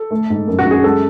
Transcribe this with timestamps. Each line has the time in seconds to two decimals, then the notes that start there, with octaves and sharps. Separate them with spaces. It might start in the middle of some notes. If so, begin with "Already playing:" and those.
Already playing: A4
0.11 A3
0.30 G#2
0.48 F#2
0.59 F#4
0.66 F#2
0.71 G#4
0.84 G#3 A4